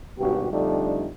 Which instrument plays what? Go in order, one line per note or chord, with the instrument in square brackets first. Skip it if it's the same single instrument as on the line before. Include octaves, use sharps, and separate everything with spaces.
[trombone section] G#1 G2 B2 F#4 G4
F2 D3 G3 A3 D4 D#4